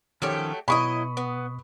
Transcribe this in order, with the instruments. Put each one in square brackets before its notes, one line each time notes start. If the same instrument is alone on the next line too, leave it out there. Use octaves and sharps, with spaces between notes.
[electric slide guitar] D#3 F3 C#4 [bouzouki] F#3 A3 G4
[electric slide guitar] B2 [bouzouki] F#3 E4 D#5 [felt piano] B5 C#6 D#6
[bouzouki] B3